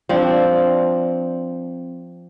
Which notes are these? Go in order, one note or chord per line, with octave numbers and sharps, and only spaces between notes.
F3 C4 D4